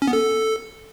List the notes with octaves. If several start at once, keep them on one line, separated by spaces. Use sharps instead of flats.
C#4
B3
A4